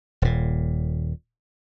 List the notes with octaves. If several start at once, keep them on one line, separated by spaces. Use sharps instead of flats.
D#1 A#2